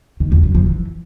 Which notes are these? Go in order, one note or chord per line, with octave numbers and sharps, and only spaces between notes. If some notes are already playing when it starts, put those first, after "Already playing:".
D#3
F2
F#2
F3
E3